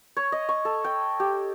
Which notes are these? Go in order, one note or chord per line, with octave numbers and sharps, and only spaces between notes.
C#5
D#5
C#6
A4
G5
G4